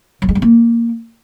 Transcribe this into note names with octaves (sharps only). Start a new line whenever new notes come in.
F#3
G#3
G3
A#3